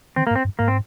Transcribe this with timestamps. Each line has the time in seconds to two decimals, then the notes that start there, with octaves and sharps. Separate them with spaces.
0.16 D#3 C4
0.27 A#3
0.31 G#2
0.36 C4
0.45 G2
0.59 G#2 A#3
0.68 C4